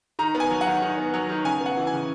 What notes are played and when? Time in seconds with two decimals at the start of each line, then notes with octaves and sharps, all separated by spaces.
0.19 D#3 A#5
0.35 B3
0.40 G#5
0.51 F#3
0.61 F#5
0.67 D#3
0.82 D#3
0.98 B3
1.14 F#3
1.29 D#3
1.45 C#3 G#5
1.60 B3
1.66 F#5
1.77 E3
1.87 G#5
1.93 C#3